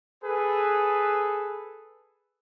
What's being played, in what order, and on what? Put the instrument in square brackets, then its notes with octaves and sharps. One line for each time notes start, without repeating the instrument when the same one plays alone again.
[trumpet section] G#4 A4 B4